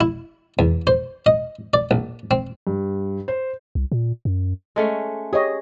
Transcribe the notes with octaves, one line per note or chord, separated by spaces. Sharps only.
E4
E2
C5
D#5
D5
A#1
C4
G2
C5
C2
A#2
F#2
G#3 A3 C#4
G4 G#4 C#5 D#5